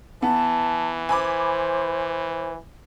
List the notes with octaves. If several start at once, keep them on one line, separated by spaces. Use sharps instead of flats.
E3 B3 A5
C5 G#5 B5 D6